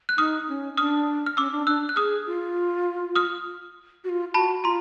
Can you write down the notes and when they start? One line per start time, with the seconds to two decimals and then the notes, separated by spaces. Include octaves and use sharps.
0.09 F#6
0.18 D#4 D#6 F6
0.48 C#4
0.77 D4 D#6 F6
1.26 F6
1.37 C#4 D6 E6
1.52 D4
1.67 D4 E6 F#6
1.89 F#6
1.96 G#4 D#6 F6
2.26 F4
3.16 D#6 F6
4.04 F#4
4.09 F4
4.34 F#4 A5 B5
4.64 F4 A#5 C6